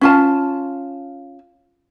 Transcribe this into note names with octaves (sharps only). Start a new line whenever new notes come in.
C#4 F4 A5